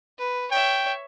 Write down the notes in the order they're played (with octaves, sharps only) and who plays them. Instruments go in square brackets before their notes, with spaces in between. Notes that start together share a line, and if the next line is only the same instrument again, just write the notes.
[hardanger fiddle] B4
[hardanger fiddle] C#5 E5 [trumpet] G5